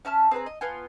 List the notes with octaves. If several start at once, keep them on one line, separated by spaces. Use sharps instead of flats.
C#4 E5 A5 F6
C4 G#4 B4 A#5
D#5
B3 F4 G#5